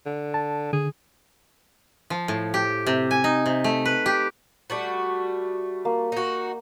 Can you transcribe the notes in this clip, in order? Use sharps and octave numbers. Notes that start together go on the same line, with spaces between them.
D3
A5
D3 G#4
F3
A2
G4
C3
G#5
D#4
C3
A3
B4
G4
G3 A3 F#4
A#3
D#4 F#4